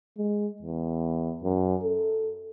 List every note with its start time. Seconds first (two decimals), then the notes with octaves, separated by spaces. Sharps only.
0.18 G#3
0.62 E2
1.44 F#2
1.84 A4